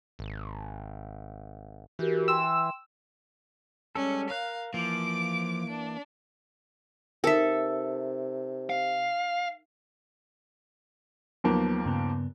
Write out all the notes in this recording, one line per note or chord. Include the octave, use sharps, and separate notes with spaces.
G#1
E3 F#4 G4 A#4
G5 C6 E6
G3 G#3 C#4 A4
A#4 F5 F#6
E3 F3 A#3 D6 D7
D4
C3 D#4 A4 A#4 E5
F5
D#2 F3 F#3 A#3 B3
G2 C#3 B3